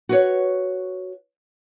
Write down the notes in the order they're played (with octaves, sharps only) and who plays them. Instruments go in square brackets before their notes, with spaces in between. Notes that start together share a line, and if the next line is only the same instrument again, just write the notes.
[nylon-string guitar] F#4 B4 C#5